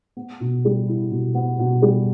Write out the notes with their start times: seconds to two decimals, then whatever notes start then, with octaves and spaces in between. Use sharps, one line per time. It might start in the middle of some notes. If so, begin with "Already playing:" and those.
0.17 B3
0.40 B2
0.65 G3
0.88 E4
1.11 B2
1.35 B3
1.59 B2
1.82 G3